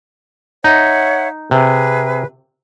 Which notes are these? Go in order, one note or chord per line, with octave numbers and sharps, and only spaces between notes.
D#4 C#5 E5 F#5
C3 G#4 B4